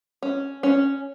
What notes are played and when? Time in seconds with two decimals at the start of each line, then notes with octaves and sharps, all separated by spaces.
0.23 C#4
0.63 C#4